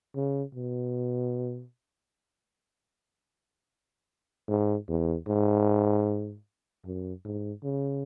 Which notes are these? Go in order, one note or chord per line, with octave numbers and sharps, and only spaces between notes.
C#3
B2
G#2
E2
G#2
F#2
G#2
C#3